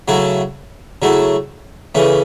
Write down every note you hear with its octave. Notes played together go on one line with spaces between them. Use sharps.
C#3 F#3 A3 E4
C#3 F#3 A3 E4
C#3 E3 A3 C#4